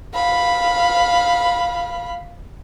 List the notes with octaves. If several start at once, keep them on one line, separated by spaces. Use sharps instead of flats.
F5 B5